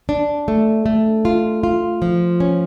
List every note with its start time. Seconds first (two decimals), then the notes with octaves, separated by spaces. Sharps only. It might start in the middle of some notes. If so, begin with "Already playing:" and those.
0.09 D4
0.48 A3
0.86 A3
1.25 F4
1.63 F4
2.02 F3
2.40 C#4